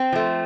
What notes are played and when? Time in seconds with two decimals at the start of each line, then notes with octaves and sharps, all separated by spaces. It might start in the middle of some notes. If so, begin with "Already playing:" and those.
Already playing: C4
0.12 F3 A3